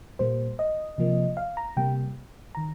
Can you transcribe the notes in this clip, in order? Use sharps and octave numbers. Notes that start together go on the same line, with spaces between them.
A#2 G3 A#3 C5
D#5
C3 F3 A#3
F5
A#5
C3 G3 A#3 G5
D#3 A#5